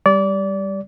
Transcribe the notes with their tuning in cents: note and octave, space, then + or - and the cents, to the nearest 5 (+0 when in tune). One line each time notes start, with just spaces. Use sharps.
G3 +10 D5 -25